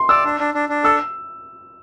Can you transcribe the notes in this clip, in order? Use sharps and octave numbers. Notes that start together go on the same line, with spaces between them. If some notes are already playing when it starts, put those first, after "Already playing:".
Already playing: C6
D5 E6
D4
D4
D4
D4
A4 E6